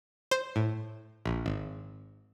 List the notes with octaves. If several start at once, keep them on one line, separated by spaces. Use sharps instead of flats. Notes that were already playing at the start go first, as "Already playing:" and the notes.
C5
A2
A#1
G#1